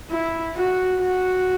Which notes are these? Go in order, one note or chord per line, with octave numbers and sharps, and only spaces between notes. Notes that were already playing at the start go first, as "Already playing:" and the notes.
E4
F#4
F#4